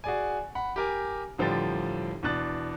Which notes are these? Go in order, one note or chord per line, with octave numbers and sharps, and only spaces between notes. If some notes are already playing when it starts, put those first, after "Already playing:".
F#4 G#4 D5 G#5
F#5 B5
G4 A#4 G#5
A1 D3 F3 G3 G5 A6
E2 B2 D4 F#6 A6